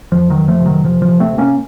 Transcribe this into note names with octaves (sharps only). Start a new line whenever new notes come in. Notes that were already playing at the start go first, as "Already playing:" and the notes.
F2 F3
D#3 F#3
F2
F3 A3
C3
D#3 F#3
C3 F3
F3
C3
A3 C4
C3
A#3 C#4